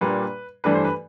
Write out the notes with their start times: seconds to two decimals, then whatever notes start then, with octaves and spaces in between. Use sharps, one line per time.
0.01 A#2 G3 A#3 D4 B4
0.64 G2 E3 A3 D4 B4
0.74 C5
0.85 B4